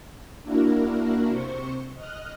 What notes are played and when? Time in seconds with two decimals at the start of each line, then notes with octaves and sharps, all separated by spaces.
0.43 A#3 D4 E4 F#4 A#4
1.29 C3 C5 C#6
1.95 D#5 F6 F#6